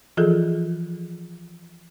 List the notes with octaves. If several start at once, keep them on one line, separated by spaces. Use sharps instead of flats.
E3 F3 F4 G#4 A4